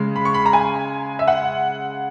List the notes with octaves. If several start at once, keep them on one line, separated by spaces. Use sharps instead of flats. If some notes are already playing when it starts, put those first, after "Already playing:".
Already playing: C#3 G#3
B5
C#6
B5
A#5
G#5
E5
F#5